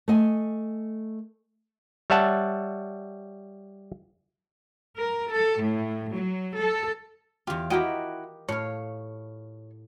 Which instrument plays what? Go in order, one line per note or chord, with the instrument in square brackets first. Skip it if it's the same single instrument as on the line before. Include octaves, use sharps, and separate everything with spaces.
[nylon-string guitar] A3 D#5 G#5
[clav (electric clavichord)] G3 C#5 E5 F#5 A5
[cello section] A#4
A4
A2
F#3
A4
[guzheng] E2 F4 [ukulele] G4
[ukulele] E4 F#4 G5 [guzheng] G4 A#4 D#5
[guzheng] A2 F5 [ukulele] C#5